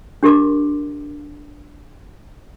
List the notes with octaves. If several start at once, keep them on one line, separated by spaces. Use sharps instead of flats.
D4 G4 A#4 C6 D6